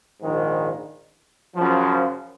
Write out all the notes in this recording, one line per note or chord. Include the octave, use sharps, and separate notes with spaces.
A#1 G#2 D#3
F#2 C#3 F3